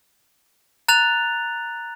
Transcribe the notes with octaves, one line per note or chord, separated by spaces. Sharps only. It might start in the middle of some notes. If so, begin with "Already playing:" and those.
A#5 F#6 A6 F7